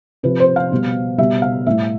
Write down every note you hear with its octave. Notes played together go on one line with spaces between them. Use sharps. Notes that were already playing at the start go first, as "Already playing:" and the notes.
C3 F3 B4
C5
F5
B2 G3
B2 G3 E5
F5
A2 G3 E5